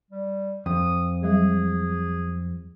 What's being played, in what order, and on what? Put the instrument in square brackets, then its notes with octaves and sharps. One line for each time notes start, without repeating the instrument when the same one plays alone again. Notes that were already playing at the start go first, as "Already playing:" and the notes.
[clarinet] G3
[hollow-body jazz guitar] F2 [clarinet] D#6
[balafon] F#3 G3 [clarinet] G#4